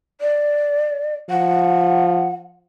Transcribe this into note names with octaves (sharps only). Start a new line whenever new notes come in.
D5
F3 F#5